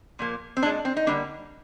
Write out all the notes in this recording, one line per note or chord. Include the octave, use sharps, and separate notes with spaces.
A#2 F3 A#3
C4
A#2 G#3 D4
C4
D#4
D3 G3 A#3 D4